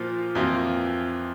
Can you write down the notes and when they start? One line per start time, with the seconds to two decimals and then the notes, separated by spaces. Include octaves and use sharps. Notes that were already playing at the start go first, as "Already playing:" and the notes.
Already playing: A#2 F3 A#3 F4
0.35 F2 E3 A#3 F4